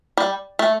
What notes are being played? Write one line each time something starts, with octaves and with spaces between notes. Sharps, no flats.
G3
A3